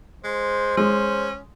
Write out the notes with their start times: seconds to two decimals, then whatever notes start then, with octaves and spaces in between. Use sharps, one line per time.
0.24 G#3 C5
0.77 G#3 C#4